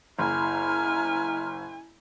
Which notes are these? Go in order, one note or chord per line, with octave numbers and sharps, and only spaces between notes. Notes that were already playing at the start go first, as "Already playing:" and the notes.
F#1 E4 G#5 A#5 F6